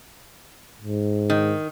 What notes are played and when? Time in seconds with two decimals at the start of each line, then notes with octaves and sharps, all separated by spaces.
0.82 G#2
1.30 D#3